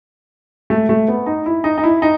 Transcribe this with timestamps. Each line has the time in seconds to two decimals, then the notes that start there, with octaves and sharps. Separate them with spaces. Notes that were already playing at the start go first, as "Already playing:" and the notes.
0.70 A3
0.89 A3
1.08 B3
1.26 D#4
1.46 E4
1.64 D#4
1.78 D#4
1.84 E4
2.02 D#4